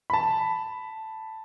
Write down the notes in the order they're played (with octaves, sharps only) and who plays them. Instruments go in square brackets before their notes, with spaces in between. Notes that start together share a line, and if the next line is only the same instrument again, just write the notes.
[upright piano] A5 B5